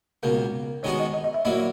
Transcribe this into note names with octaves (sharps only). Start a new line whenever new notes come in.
C#2 B2 A#3 A#4
D#3 G#3 B3 D#4 F#4 C#5
D#5
D#5
D#5
E5
A#2 F#3 A#3 E4 D#5